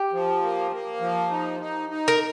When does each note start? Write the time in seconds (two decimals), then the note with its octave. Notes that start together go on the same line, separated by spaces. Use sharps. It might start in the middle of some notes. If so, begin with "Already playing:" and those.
Already playing: G4
0.13 F3
0.42 A#3
0.71 A#3
1.00 F3
1.30 D#4
1.60 D#4
1.89 D#4
2.08 A#4